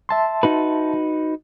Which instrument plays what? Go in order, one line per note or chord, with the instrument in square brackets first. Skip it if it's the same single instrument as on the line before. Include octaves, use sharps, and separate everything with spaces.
[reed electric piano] E5 A5 C6
[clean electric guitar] D#4 F#4 B4